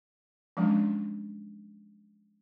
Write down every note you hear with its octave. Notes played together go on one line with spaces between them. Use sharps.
F3 F#3 G#3 C#4 D4